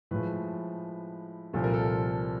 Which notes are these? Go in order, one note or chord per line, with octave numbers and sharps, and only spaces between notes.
A2 F3 G#3 B4
C2 A#2 F3 A4
A#4
A4